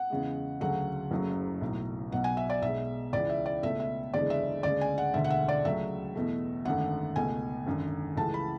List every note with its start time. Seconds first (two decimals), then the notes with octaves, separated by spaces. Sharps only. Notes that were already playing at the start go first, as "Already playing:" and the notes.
Already playing: F#5
0.10 E2 C#3 G#3
0.61 D2 C#3 F#3 A3 F#5
1.11 F#1 F#2 C#3 F#3 A3
1.61 B1 A2 F#3
2.11 B1 B2 F#3 F#5
2.24 G#5
2.37 E5
2.50 D5
2.62 B1 B2 G#3 E5
3.13 C#2 C#3 E3 D5
3.30 E5
3.46 D5
3.63 C#2 B2 A3 E5
3.80 E5
4.14 F#1 E2 D3 G#3 D5
4.30 E5
4.63 D2 C#3 G#3 D5
4.81 G#5
4.98 F#5
5.14 E1 D2 D3 E5
5.24 F#5
5.30 E5
5.48 D5
5.65 C#2 C#3 F#3 A3 E5
6.15 E2 B2 A3
6.65 G#1 F#2 D3 A3 F#5
7.16 C#2 B2 A3 G#5
7.66 G#1 F#2 D3
8.17 C#2 C#3 E3 A3 A5
8.34 B5